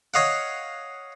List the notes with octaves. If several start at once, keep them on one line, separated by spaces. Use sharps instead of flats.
C#5 D#5 F5 F#5